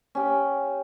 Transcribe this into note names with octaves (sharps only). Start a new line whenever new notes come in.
C#4 G4